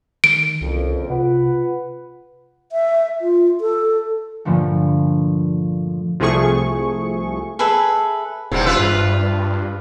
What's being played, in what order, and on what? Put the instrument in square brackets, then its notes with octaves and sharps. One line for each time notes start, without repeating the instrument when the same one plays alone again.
[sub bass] D#3 [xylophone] D7
[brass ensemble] F#1 F2 [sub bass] C2
[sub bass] C3 [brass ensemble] F4 B4 F#5
[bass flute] E5
F4
A4
[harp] G2 A#2 D3 F3 A3
[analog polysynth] C2 C3 F3 A3 G#4 C#6
[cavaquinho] G#4 A4 B4 E5
[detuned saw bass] E1 [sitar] G#2 C3 G3
[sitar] F4 B4 E5
[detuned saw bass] G2